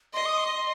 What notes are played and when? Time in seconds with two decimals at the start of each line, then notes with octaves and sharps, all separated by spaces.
0.14 D#5 C6
0.26 D#6
0.38 C6